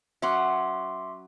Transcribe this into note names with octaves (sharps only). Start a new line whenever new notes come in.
F#3 C#4 E5 F#5 C6 D6